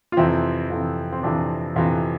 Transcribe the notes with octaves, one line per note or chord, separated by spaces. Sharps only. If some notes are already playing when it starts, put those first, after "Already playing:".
F4
F2 C3 E3 C4 E4
F2 C3 E3
C4
F2 C3 E3 D4
F2 C3 E3